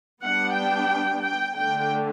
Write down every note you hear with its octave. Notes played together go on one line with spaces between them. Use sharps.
G3 B3 D4 F#5
G5
G5
D3 A3 D4 G5